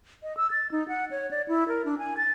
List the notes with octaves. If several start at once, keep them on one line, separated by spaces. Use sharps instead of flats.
D#5
E6
A6
D#4
F#5
C#5
D5
E4
A#4
D4
G#5
A6